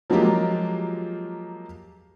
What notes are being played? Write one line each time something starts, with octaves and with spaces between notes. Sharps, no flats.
F3 F#3 G#3 A#3 F4 G4